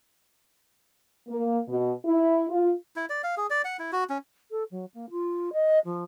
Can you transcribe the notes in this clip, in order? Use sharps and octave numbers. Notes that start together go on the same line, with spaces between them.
A#3
B2
E4
F4
E4
D5
F5
G#4
D5
F#5
E4
F#4
C#4
A4
F#3
A#3
F4
D#5
F3